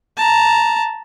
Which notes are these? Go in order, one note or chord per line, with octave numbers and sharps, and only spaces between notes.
A5 A#5